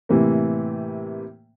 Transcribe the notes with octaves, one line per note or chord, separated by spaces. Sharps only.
A2 C3 E3 A#3